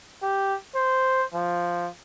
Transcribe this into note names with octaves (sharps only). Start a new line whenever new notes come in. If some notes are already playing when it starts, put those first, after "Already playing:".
G4
C5
F3